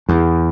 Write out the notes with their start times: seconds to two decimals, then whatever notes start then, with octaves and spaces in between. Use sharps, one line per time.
0.09 E2